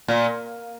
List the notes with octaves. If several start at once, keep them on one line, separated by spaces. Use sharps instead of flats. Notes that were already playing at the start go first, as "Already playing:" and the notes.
A#2